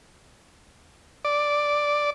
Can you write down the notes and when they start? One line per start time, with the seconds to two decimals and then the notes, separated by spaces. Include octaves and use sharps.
1.25 D5